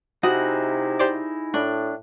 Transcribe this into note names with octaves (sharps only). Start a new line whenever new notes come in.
C3 D#4 E4 F#4 G#4 D#6
G4 C5 D5
A2 D4